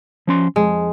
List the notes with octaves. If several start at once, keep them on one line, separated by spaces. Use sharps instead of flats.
F3 C#4 C6
F2 G#3